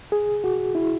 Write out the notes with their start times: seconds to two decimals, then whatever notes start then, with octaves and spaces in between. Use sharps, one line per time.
0.12 G#4
0.44 F#4
0.75 E4